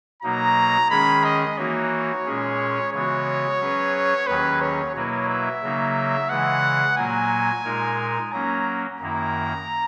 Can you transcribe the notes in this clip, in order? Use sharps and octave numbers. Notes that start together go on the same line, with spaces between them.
B2 F#3 A#3 D#4 A#5
D#3 G#3 C#4 G#4 B5
D#5
E3 A#3 D#4 F#4 C#5
A#2 G#3 C#4 G#4
C#3 E3 G#3 B3 F#4 C#5
F#3 C#4 G#4 B4
D#2 D#3 F#3 C#4 G#4 B4
C#5
B2 F#3 A#3 E4 B4 C#5
E5
C#3 F#3 A#3 D#4
C#3 E3 G#3 F#5
A#2 F#3 A#3 G#5
A#2 G#3 D#4 A#4
F#3 A#3 C#4 A#5
F#2 D#3 A#3 E4 A#5